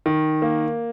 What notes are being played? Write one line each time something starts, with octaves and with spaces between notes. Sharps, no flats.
D#3
A#3